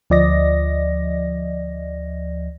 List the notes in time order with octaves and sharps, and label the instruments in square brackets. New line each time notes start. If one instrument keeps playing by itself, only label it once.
[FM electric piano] D2 F3 D5 D#5 A#6